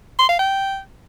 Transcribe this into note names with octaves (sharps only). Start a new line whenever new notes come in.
C6
F5
G5